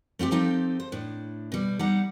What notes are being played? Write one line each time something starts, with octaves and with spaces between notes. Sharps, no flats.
A3 C4 F4 G4
F3 C4 D#4 G4 A4
C5
A2 D4
B2 G3
G3 D#4 F#5